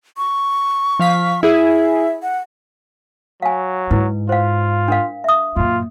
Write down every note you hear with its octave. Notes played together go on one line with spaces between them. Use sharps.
C#6
F3 F5 B6
E4 G#4 E5
F#5
F#3 F5 G#5
G#2 E4 B4
F4 C5 F5
D4 A#4 F5
E5 D#6
F#2 A#2 F4